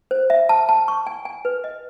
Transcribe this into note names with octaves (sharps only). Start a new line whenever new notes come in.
C5
E5
A5
A5
C#6
G#5
G#5
B4
D#5